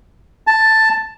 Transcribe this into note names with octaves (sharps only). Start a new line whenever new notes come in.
A5